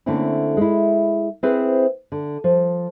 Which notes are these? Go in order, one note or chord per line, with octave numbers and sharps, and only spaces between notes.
D3 A3 A#3 C4 C#4 E4
G#3 E4
C4 E4 G#4 B4 C5
D3
F3